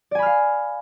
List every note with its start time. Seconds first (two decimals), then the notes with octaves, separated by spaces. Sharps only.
0.11 D5
0.15 G#5
0.19 B5
0.22 F6
0.26 F5